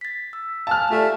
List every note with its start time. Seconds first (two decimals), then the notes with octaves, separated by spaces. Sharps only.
0.01 A6 B6
0.33 E6
0.67 F5 G#5 A5 F6
0.91 A3 F4 G4 D5